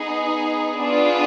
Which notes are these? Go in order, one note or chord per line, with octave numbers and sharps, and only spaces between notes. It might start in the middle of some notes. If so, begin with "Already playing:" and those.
Already playing: B3 D#4 G#4
B3 D4 F4 G#4